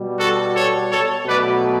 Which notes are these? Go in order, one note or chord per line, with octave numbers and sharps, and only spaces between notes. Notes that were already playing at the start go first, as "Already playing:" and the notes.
Already playing: B2 G3
F#4 A4
A4 C#5
A4 C#5
B2 F#3 A3 B4 D5